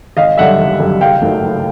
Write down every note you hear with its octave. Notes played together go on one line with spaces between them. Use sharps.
G#1 D#5 F5
F#2 D3 G3 E5 F#5
G#1
F#2 D3 G3
F#1 F5 G5
F#2 D#3 F#3 A3
F#1